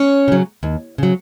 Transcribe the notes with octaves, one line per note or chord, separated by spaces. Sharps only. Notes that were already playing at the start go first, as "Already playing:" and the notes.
Already playing: C#4 C#5
C#3 F#3
D#2
C#3 F#3